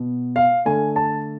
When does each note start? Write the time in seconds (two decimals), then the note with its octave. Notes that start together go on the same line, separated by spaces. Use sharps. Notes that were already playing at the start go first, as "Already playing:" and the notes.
Already playing: B2 B3
0.36 F5
0.65 D3 A3 G#5
0.96 A5